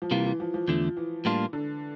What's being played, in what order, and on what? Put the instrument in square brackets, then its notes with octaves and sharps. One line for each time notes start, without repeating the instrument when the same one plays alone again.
[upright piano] F3
[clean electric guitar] C3 G3 A#3 F4 [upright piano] E3
[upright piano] E3
F3
F3
[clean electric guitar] E2 D3 A3
[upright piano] E3
[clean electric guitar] A2 G3 A#3 D4 F4
[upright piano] D3